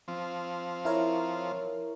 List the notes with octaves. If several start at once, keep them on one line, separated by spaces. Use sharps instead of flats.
F3 C4
E4 A#4 C#5